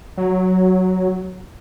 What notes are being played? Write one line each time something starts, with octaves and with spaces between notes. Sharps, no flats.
F#3